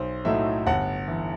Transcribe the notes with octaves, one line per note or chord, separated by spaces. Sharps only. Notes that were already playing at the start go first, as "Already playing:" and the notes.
Already playing: B1 C5
A2 F#3 A3 D#4 E5
G1 F#5
E3